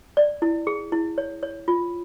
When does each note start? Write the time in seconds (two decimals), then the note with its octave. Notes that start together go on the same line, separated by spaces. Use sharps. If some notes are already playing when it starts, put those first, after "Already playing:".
0.17 D5
0.42 E4
0.67 G#4
0.92 E4
1.18 C#5
1.43 C#5
1.68 F4